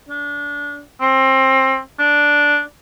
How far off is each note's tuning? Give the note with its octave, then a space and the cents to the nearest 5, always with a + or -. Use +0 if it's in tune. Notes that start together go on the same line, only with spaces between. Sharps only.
D4 -25
C4 +25
D4 -5